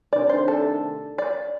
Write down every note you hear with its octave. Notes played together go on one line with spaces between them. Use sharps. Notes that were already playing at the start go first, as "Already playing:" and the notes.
C3 D#3 A3 D4 D5
C5
A4
D5